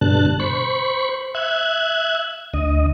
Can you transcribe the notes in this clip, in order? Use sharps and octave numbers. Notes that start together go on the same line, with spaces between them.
G2 B2 D3 A5 F#6
C5 B5 C#6
E5 F#6 G#6
D2 D#5